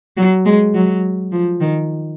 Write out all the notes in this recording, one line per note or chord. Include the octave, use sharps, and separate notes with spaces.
F#3
G#3
F#3
F3
D#3